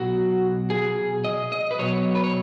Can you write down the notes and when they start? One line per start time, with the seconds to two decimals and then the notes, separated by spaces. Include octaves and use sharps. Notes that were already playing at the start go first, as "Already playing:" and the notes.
Already playing: B2 F#3 F#4
0.70 G#4
1.24 D#5
1.52 D#5
1.71 B4
1.79 B2 F#3 C#5
2.15 B4
2.24 C#5